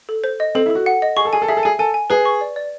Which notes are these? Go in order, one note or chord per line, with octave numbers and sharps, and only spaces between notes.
A4
C5
D#5
C4 A4
E4
A4
F#4
F#5
D#5
G#4 C#6
A4
G#4 G#5
A4
G#4 E5
A4
G#4 G#5
A4 G#5
G#5
G#4 B4
C#6
D5
D5